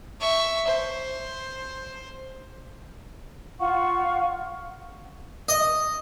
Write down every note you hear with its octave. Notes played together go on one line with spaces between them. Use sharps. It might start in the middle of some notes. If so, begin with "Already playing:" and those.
E5 C#6
C5
F4 F5 F#5 C#6
D#5